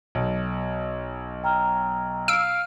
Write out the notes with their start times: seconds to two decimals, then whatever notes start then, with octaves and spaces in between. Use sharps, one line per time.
0.15 B1
1.43 G5 A#5 F6
2.28 F5 E6 D7